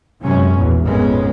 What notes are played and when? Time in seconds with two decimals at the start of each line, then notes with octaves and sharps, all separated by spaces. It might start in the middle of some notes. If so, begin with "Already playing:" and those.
0.22 F#2 C3 F#3 G#3 C#4
0.57 A#1 E2 B2
0.86 G#1 F2 A#2 G#3 B3 C#4